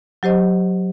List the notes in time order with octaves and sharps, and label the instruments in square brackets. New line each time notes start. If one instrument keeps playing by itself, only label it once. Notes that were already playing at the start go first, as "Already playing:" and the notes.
[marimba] F#3 G4 C5 D#5